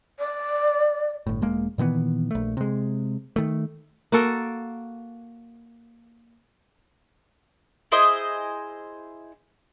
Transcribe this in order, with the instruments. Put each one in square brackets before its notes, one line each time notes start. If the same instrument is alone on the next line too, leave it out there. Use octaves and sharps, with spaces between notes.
[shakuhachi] D5
[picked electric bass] G1 A2
E1 G#3 A#3
A#2 D#3 E3 B3
A#1 A3
C3 G#3
D#3 A3
[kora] A#3 F#4 A4
[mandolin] E4 G#4 C5 D#5